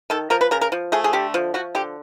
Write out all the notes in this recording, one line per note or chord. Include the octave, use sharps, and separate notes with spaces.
D#3 A4
F3 A#4
B4
C#3 A#4
A#4
F3
A3 G#4
G#4
D3 G4
F3
F3 F#4
D3 G4